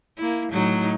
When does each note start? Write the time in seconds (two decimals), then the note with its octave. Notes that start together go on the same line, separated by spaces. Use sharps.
0.18 A#3 E4
0.51 A2 F#3 D#4